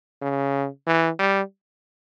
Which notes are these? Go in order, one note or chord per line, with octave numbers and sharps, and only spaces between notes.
C#3
E3
G3